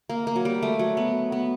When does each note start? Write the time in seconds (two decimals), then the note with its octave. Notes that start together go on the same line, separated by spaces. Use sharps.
0.09 A#3
0.27 A#3
0.36 F#3
0.45 G3
0.63 A3
0.79 F#3
0.97 B3
1.32 B3